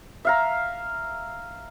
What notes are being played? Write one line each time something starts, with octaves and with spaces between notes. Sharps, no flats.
E5 F5 A#5